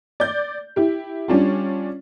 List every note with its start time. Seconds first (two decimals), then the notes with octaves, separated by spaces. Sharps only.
0.20 D5 G6
0.76 E4 G4
1.28 G3 C#4 D4 F4